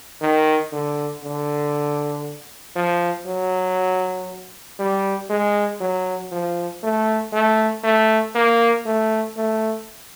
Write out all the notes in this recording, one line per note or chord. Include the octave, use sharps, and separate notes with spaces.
D#3
D3
D3
F3
F#3
G3
G#3
F#3
F3
A3
A3
A3
A#3
A3
A3